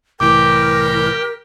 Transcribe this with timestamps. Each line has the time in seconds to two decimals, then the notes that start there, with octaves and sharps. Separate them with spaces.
0.20 C2 A2 E3 G4 A#4 G5 D6